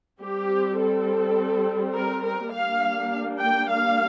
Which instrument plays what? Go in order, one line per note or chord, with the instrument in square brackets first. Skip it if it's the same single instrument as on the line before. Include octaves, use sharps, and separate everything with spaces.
[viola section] G3 C4 G4
A4
A#4
A#4
G3 A#3 D4 F5
G5
F5